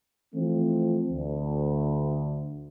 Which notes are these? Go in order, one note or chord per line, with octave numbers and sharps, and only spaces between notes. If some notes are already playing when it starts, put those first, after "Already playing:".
E3 F3 A3 C4
D2